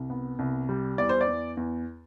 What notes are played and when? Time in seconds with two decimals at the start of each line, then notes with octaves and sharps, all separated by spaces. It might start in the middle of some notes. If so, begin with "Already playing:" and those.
Already playing: C2
0.10 B3
0.39 C2
0.69 G3
0.98 E2 D5
1.09 C5
1.21 D5
1.28 E2
1.57 E2